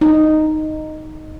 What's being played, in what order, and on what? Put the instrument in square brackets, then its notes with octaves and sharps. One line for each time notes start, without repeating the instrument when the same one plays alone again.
[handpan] D#4